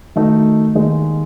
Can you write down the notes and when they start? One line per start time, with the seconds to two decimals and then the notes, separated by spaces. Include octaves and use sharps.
0.16 D#3 A3 D#4 F#4
0.75 D#2 D#3 G#3 D#4